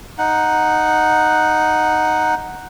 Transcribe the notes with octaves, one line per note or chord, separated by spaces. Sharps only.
D#4 F#5